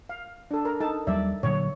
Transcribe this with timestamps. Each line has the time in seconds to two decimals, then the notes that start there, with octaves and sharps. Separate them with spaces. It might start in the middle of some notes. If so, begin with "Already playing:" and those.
0.09 F5
0.51 D4 A4
0.65 A#4
0.80 D#4 A4 A5
1.07 D#2 F#3 G3 D5 E5
1.43 A#2 D3 F#3 C#5